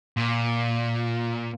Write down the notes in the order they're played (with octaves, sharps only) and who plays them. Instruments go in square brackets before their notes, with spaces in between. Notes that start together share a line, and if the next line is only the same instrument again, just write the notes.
[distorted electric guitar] A#2